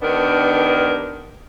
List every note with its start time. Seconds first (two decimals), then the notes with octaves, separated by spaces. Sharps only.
0.01 G2 D#3 B3 D4 A#4